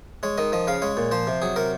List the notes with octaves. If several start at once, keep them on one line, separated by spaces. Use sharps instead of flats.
G#3 C#5
D#3 D#5
F3 D#5
C#3 F5
G#3 C#5
A#2
F3 C5
C3
F#3 G#4
C3 A#4